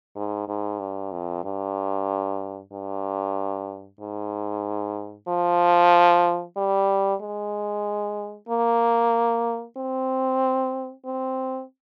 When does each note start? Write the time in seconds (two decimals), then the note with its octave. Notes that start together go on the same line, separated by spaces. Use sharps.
0.16 G#2
0.48 G#2
0.80 G2
1.12 F2
1.44 G2
2.73 G2
4.01 G#2
5.28 F3
6.57 G3
7.21 G#3
8.49 A#3
9.77 C4
11.05 C4